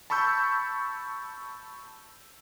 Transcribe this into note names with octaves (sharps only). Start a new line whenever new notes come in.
A5 B5 C#6 E6 G6